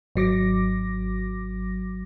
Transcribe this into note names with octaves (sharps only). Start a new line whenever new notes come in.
G#1 F#3 D6 A#6